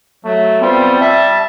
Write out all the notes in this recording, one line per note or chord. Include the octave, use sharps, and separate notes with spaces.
F#3 A3
G3 B3 C4 F4
E5 A5